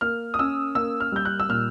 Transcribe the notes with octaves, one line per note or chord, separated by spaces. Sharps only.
A#3 F6
D#6
C#4 E6
A#3 E6
F6
G3 G6
F#6
E6
A#2 F6